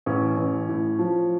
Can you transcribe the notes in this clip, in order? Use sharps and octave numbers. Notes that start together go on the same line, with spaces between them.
A1 C#4
A1
A2
F3